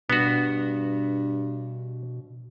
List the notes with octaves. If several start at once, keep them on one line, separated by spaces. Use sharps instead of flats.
G2 B2 B3 F#4